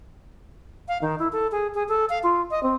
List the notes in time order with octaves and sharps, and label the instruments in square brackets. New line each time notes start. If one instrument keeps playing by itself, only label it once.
[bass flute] F5
D#3
E4
A4
G#4
G#4
A4
F5
F4
D#5
C4